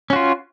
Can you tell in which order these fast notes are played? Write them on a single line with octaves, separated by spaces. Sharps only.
C#4 F#4 F4